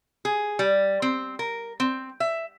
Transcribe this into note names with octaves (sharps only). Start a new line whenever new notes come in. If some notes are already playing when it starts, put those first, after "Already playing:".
G#4
G3
C4
A#4
C4
E5